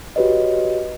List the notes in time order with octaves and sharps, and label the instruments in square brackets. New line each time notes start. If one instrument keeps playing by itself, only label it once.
[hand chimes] F#4 G4 B4 C#5 D#5